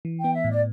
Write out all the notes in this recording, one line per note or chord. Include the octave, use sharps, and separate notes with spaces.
E3
B3 G5
E5
A2
D5